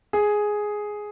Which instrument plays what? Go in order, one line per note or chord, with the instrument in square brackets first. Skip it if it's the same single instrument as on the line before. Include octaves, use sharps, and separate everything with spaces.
[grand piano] G#4